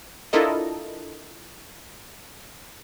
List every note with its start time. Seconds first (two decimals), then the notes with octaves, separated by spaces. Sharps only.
0.33 D4 E4 F4 A4 A#4 D#5